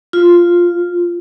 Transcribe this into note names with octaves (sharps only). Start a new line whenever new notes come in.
F4